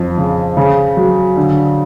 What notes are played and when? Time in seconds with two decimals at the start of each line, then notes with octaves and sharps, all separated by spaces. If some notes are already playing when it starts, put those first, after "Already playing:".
Already playing: F2
0.18 C#3
0.57 C#3
0.97 F#3
1.37 D3